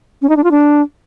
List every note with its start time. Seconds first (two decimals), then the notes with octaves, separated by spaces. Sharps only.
0.22 C#4
0.29 D#4
0.37 D4
0.44 F4
0.51 D4